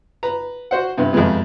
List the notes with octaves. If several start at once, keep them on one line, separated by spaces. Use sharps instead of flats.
B4 A#5
F#4 C5 F#5
G2 C3 B3
F2 C3 F3 G#3 B3